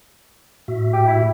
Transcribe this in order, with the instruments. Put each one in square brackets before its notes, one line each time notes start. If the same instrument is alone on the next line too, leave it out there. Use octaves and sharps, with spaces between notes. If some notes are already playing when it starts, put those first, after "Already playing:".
[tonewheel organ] A2 F#4 E5
[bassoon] G4
E4